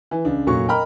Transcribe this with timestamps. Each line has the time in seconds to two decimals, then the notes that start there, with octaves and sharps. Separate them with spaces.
0.11 E3
0.25 C#2 D4
0.46 F1 A#2 F#3 C#6
0.68 A#4 D#5 G5 A#5 B5 F6